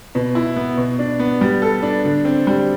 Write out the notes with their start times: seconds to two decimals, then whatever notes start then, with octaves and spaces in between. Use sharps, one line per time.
0.15 B2
0.35 E4
0.56 B3
0.77 B2
0.99 D4
1.19 B3
1.41 G3
1.62 A4
1.83 D4
2.05 D3
2.25 C4
2.47 G3